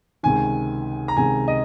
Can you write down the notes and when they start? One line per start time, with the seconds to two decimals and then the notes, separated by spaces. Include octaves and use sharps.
0.23 C#2 C3 D#3 G#5
1.08 A#5
1.16 C#2 C3 D#3 G#5
1.48 D#5